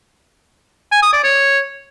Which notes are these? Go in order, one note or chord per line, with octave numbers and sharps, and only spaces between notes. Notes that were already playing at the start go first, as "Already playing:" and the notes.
G#5
D#6
D5
C#5